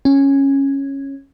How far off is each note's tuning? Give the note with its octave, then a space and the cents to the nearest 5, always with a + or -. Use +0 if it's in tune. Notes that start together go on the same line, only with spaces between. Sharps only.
C#4 -10